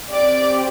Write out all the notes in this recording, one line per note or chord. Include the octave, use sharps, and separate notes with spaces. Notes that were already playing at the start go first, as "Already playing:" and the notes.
C4 G4 D5